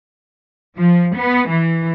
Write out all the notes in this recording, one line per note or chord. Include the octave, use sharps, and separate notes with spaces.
F3
B3
E3